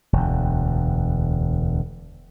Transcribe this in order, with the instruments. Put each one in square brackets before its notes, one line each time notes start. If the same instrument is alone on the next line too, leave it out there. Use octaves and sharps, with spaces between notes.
[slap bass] E1 D2